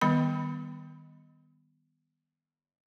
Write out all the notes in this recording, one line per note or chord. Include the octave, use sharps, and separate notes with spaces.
D#3 G3 B3 B5